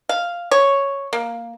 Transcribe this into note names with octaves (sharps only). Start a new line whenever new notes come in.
F5
C#5
A#3